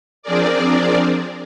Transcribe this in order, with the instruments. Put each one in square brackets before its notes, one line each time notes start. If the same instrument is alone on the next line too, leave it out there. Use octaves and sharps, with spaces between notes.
[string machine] F3 C4 D4 G#4 A#4 D5